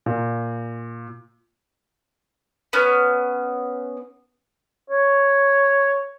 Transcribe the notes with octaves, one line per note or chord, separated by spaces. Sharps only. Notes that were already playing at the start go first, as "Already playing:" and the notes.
A#2
B3 C#4
C#5